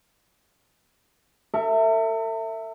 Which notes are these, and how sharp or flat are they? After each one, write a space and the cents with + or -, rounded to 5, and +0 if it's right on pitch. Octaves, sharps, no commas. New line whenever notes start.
A4 +45 E5 +0